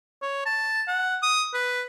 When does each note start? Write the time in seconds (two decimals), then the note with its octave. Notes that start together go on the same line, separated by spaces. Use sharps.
0.22 C#5
0.46 A5
0.88 F#5
1.23 D#6
1.54 B4